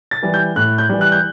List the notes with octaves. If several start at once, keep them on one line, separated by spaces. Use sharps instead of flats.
A6
E3 G3
G6
A2 F#6
G6
E3 G3
F#6
G6